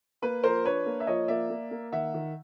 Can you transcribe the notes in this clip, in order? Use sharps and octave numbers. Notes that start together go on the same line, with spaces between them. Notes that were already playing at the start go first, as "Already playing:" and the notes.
A#3 B4
F3 A#4 C5
D4 B4 C#5
A#3
E5
F3 C#5 D#5
A#3 D5 E5
A#3
A#3
D#3 E5 F#5
D#3